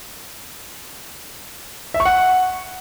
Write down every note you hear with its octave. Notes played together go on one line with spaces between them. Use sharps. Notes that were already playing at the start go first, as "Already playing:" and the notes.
E5
C#6
F#5